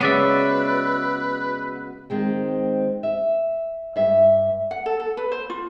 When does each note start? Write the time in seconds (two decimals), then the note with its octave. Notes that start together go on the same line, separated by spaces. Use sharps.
0.01 C#3 F#3 G#3 B3 B4 D5 E5
2.10 D#3 G#3 C4
3.03 E5
3.96 G2 E5
4.71 F#5
4.86 A4
5.00 A4
5.17 B4
5.32 C5
5.50 F4